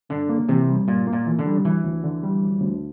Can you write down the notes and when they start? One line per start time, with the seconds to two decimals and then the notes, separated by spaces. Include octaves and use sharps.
0.09 G2 D3
0.29 A#3
0.49 C3 E3
0.68 G3
0.88 G2 A#2
1.07 A#3
1.13 A#2
1.26 E3
1.39 D3
1.46 G3
1.65 D2 E3
1.84 D2
2.04 D3
2.23 G3
2.42 D2
2.61 D2